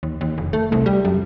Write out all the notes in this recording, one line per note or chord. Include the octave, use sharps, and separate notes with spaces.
D#2
D#2
F1
A3
C2
G3
F#2